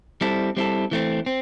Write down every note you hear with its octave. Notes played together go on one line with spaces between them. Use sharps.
G3 C4 E4 A4
G3 C4 E4 A4
E3 A3 C4
C4